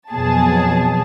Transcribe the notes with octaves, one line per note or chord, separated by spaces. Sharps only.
F2 B2 F#3 G#4 A5